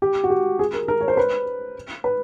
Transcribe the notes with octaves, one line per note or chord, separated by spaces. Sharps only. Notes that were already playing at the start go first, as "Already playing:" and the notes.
G4
F#4
G4
G#4
A#4
A#4
C#5
C5
B4
B4